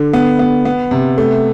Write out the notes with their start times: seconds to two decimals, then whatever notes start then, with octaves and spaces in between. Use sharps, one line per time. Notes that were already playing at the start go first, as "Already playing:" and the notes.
Already playing: D3
0.13 B3
0.39 B3
0.65 B3
0.91 C3
1.18 A3